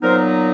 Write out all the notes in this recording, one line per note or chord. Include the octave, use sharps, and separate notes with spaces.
A#2 F#3 B3 D#4 A#4 C5